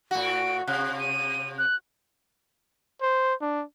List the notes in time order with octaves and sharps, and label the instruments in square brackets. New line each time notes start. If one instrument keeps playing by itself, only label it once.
[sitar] A2 F#4
[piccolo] D7
[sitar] C3 [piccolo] F#6
[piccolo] D#7
F#6
[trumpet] C5
D4